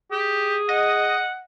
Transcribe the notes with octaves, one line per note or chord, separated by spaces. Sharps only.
G4 G#4
D#5 F#5